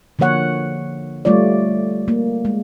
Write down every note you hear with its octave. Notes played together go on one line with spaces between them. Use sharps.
D3 F3 A#3 C#5 F#5
G3 A3 F4 C#5 D5
A#3
G#3